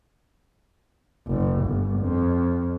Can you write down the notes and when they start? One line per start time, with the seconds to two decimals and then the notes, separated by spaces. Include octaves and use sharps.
1.27 F#1
1.61 G1
2.00 F2